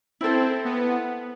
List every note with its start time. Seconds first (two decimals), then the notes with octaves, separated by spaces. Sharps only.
0.21 C4 E4 A4 C5
0.65 B3